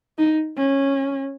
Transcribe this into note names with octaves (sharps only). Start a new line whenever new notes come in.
D#4
C#4